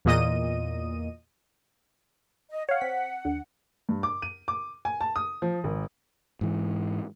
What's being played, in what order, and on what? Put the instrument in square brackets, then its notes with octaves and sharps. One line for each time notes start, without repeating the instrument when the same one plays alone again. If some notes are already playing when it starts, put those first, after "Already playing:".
[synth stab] E2 A#2 D#5 D#7
[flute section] D#5
[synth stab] C#5 F5 [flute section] F#5
[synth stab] C4 B6
D#2 D3
[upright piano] G2
D6
D#7
D6
G#5
A5
D#6
F3
G#1
[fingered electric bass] G#2 E3